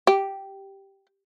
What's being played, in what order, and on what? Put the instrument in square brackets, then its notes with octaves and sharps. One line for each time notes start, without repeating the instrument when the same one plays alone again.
[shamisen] G4